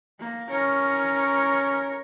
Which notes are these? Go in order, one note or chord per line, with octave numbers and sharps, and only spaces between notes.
A#3
C#4 A#4 C#5